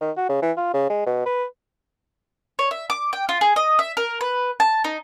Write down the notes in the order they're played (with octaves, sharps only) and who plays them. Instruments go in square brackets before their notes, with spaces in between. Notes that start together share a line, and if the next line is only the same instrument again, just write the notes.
[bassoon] D#3
F#4
C#3
E3
F4
C#3
G#3
B2
B4
[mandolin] C#5
E5
D6
G5
F4
G#4
D#5
E5
A#4
B4
A5
D#4